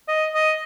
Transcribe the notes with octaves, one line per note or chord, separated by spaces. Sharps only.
D#5
D#5